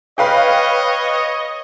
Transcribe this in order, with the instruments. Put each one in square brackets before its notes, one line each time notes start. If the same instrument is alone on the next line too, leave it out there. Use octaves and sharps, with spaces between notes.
[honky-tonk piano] B4 F5 G5 [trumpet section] C#5 D#5